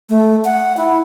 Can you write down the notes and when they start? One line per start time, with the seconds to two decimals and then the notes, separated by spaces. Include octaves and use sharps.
0.09 A3
0.45 F#5
0.77 E4